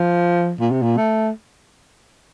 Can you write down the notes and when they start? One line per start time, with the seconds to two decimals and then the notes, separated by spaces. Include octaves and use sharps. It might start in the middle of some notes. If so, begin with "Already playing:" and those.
Already playing: F3
0.60 A#2
0.71 C3
0.83 A#2
0.97 A3